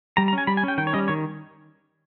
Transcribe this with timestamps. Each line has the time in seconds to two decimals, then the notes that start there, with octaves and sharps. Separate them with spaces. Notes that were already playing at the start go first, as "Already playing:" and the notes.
0.17 G3 A#5
0.28 A#5
0.33 C#4
0.38 G#5
0.47 G3 B5
0.57 G#5
0.63 C#4 G5
0.78 D#3 G5
0.87 C#5
0.93 G3 C#4 D#5
1.08 D#3 C#5